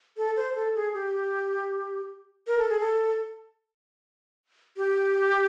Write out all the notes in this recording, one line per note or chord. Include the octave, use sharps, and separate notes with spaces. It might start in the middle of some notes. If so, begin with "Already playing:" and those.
A4
C5
A4
G#4
G4
A#4
A4
G#4
A4
G4